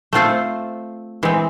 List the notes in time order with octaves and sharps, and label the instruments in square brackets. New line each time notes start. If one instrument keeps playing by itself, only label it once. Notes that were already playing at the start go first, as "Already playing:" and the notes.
[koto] A3 C4 F4 A4 C5
E3 G#3 C4